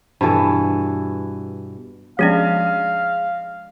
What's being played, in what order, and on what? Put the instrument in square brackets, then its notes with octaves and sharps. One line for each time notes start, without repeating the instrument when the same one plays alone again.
[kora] G2 B2 E3 A4
[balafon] F3 B3 C#4 [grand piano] G#3 D4 [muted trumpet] F5